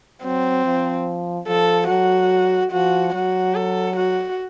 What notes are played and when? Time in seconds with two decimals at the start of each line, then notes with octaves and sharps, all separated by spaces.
0.23 F#3 C4
0.65 F3
1.47 F3 A4
1.89 F#3 F#4
2.72 F3 F#4
3.14 F#3 F#4
3.55 A4
3.97 F#4